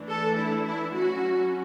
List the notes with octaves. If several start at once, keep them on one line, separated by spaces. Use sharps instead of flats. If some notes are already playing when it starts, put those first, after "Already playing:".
Already playing: E3 A3 D4
A4
E4
E4
F#3 C#4 F#4